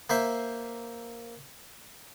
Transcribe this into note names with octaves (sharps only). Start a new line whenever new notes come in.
A#3 C5 E5